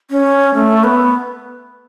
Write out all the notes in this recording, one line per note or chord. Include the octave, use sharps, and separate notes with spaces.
C#4
A3
B3